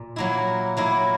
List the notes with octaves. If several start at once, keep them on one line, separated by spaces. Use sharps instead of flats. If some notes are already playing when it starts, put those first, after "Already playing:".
Already playing: A#2
F#3 A#3 E4
F#3 A#3 E4